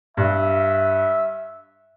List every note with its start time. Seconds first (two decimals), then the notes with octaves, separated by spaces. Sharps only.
0.17 G2 E5